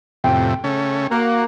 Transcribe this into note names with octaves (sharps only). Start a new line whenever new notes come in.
F2 A2 C3 G5
C#3 A3 C#4
A#3 F#4